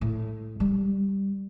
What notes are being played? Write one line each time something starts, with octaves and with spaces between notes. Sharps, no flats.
A2
G3